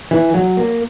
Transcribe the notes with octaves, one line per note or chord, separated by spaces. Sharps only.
E3
F#3
A#3